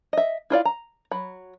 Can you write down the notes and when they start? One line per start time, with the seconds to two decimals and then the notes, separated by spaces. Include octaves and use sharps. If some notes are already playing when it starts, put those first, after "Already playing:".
0.13 D#5 E5
0.50 E4 F4 D5 F5
0.65 A#5
1.11 F#3 B5